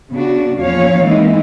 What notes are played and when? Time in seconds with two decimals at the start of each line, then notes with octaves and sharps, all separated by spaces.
0.10 C#3 B3 D4 F#4
0.58 E2 A#2 F3 C#4 C#5 F5
1.03 E3 G#3 A#3 C4 D#4